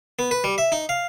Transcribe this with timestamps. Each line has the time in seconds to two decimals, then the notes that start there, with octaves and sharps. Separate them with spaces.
0.19 B3
0.31 B4
0.44 G3
0.58 E5
0.72 D#4
0.89 F5